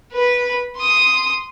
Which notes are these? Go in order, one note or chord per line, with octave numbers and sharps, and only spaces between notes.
B4 B5
C6 D#6